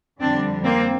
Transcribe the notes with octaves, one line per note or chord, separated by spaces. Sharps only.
F2 D3 G3 C4 D4
A#3 C4